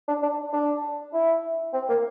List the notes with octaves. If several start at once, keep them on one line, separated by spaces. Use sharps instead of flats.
D4
D4
D4
E4
C4
A#3